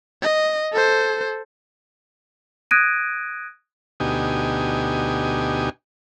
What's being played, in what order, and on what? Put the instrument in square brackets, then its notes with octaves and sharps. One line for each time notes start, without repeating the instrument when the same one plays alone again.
[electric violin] D#5
A4 C5
[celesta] D#6 F#6 G#6 A#6 D7 D#7
[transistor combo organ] D2 B2 D#4 G4 G#5